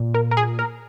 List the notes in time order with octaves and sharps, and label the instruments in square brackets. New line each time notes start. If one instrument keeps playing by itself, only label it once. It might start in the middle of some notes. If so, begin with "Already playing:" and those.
Already playing: [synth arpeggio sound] A#2
A#4
A#4
G#4
A#4